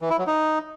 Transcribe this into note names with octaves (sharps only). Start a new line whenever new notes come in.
E3
E4
F#3
D#4